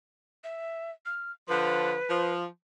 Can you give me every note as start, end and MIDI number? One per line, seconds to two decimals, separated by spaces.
0.44 0.91 76
1.06 1.31 89
1.48 1.94 50
1.48 1.94 53
1.48 2.33 71
2.08 2.44 53